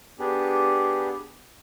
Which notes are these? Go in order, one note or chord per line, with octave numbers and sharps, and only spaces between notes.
B3 D4 G4 G#4